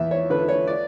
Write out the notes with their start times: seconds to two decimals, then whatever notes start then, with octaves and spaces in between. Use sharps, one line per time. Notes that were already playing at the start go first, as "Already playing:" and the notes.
Already playing: E2 E5
0.11 C#5
0.30 D3 B4
0.48 C#5
0.67 D5